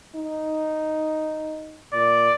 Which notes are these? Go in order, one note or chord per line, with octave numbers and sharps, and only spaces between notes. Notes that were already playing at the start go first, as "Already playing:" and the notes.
D#4
A#2 D5